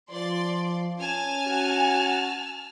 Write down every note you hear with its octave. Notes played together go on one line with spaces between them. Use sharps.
F3 D5 C6
C#4 G#5 A5 F6
F#4